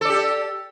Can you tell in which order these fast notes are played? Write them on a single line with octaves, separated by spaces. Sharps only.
A4 D5 G4